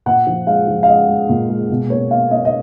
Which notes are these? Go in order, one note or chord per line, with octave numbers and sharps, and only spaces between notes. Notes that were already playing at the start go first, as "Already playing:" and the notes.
A#2 F#5
F3
G#3 F5
F3
F5
G#3 D#5
G#3
A#2
G#3
B2
A#3 C#5
A#3 F5
A#3 D#5
D#5